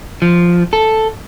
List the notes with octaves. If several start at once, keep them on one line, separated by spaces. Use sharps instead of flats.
F3
A4